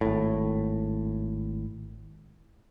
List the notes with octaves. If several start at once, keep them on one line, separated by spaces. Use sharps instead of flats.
G#1 A2